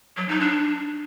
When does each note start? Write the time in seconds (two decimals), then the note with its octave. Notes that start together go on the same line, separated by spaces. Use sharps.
0.17 F#3
0.29 D#4
0.40 D4